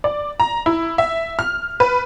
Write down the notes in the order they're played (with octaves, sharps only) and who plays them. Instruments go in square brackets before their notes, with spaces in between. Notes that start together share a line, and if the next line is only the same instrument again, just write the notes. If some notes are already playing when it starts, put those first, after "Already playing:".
[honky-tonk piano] D5
A#5
E4
E5
F6
B4